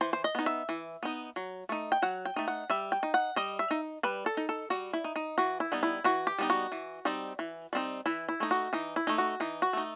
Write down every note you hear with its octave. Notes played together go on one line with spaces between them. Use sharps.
E3 C5
C5
D#5
B3 D#4
E5
E3
B3 D#4
F#3
A3 D#4
G5
F#3 F#5
G5
A3 D#4
F#5
G3 E5
G5
D#4
F#5
G3 D#5
E5
D#4
G3 B4
A4
D#4
A4
G3 F#4
E4
D#4
D#4
E3 F#4
E4
G3 B3 D#4
E4
E3 F#4
G4
G3 B3 D#4
F#4
E3
G3 C4 D#4
E3
G3 C4 D#4
E3 E4
E4
A3 D#4
F#4
E3 D#4
E4
A3 D#4
F#4
E3 D#4
F#4
A3 D#4